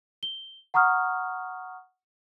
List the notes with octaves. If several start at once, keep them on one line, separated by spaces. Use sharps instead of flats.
G7
F#5 A#5 C#6 D#6 F6